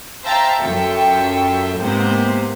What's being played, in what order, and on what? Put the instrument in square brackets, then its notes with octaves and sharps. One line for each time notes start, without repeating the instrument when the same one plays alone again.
[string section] C5 E5 F5 G5 A5 A#5
F#2 F4 A4 E5 G5 C#7
G#2 C3 A#3 B3 C5